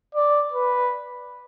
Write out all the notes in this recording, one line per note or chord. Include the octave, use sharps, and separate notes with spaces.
D5
B4